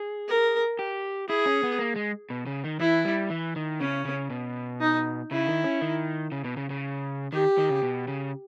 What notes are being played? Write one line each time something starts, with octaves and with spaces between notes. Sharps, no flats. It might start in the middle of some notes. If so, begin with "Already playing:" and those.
Already playing: G#4
A#4
G4
E4 G#4
C#4
B3
A#3
G#3
B2
C#3
D#3
E3 E4
G3
E3
D#3
C#3 C#4
C#3
B2
D#4
C#3 E4
D#3
C#4
D#3
C#3
B2
C#3
C#3
D#3 G4
D#3
C#3
B2
C#3